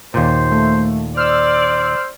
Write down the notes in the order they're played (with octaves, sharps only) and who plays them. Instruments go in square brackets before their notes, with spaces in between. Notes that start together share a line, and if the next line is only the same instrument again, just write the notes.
[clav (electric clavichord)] D#2 A#2 [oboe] C5
[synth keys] A3
[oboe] C5 [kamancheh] D5 [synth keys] E6 F6